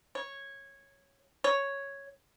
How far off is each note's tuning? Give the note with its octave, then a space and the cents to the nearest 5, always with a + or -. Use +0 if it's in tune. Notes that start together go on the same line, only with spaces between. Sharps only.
C#5 -10
C#5 +0